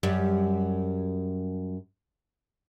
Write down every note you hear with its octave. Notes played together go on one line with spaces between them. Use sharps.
F#2 G3